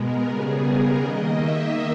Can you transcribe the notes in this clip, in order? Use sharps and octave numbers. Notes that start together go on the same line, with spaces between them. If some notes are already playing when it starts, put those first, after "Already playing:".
Already playing: B2 G#3 B3 A#4
C#3 G3 B3 G#4
A#4
D#3 A#3 D#5
E5